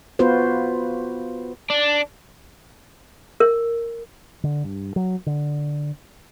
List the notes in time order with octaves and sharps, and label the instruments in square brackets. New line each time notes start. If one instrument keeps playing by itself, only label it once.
[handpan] B3 F4 F#4 B4 C5
[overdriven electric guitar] D4
[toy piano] A#4
[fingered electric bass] D3
G2
F#3
D3